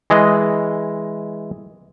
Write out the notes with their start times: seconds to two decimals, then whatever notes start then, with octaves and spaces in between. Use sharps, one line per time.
0.10 E3 G#3 D#5